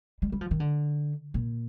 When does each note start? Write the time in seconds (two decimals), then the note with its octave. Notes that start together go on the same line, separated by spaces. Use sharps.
0.22 G3
0.32 G3
0.41 F3
0.51 D#3
0.60 D3
1.34 A#2